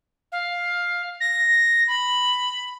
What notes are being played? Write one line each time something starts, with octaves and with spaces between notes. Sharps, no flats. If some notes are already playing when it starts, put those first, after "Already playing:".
F5
A#6
B5